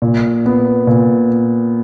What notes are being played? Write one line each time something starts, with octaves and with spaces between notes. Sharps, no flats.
A#2
B3
A#2